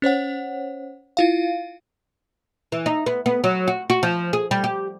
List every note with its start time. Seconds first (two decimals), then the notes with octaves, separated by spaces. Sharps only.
0.02 C#4 C5 C#5 F#5
1.17 E4 F4 F5
2.72 E3
2.86 D#4
3.06 B3
3.26 B3
3.44 F#3
3.68 F#4
3.90 F#4
4.03 F3
4.33 G#4
4.51 G3
4.64 G4